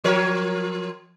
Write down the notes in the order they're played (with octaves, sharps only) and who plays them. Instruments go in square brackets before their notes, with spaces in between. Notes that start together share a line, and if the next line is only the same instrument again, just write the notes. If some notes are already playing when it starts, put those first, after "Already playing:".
[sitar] F3 A#4 C#5